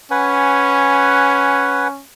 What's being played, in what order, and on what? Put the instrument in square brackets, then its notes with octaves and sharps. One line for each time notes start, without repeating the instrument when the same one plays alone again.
[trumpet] C#4 [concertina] B4 F#5 G#5